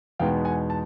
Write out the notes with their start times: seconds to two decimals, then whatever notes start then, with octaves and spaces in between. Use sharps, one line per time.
0.19 E2 B2 G#3 B3 D#4 F5 G5
0.45 F#5 G#5
0.70 A5